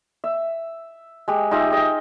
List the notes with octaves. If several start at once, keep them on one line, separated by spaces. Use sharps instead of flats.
E5
G#3 G4
D#4 F4 G4 E5
G#4 D#5 G5